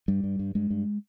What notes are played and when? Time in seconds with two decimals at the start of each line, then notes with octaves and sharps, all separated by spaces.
0.08 G2 G3
0.24 G2
0.39 G2
0.55 G2 G#3
0.70 G2